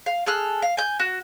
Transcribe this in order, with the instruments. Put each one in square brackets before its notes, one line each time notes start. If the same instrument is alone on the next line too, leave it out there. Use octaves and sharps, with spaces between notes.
[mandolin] F5
G#4 A4 F6 F#6
F5
G#5 G6
F#4